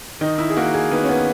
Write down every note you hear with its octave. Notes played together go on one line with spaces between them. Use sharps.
D#3 D#4
E4
G#4
A#3 F#4
G#4
D#3 B3
C#4
B3